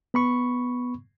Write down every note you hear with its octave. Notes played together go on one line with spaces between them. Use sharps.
B3 B5 C#6